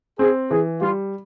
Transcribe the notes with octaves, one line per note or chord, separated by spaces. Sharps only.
C4 G#4
E3 G#4
G3 F4